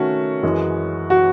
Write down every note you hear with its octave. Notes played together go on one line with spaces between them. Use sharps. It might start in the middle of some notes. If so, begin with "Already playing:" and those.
Already playing: D#3 A3 C#4 F#4
F#2 E3 G#3
F#4